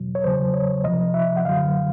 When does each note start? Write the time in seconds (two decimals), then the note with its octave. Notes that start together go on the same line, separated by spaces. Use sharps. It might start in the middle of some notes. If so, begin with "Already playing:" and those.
Already playing: E2 B2 F#3
0.15 C#5
0.24 E2 C#3 F#3 C5
0.54 C#5
0.84 D2 C3 F3 D#5
1.14 E5
1.37 F#5
1.45 F#2 D3 F#3 F5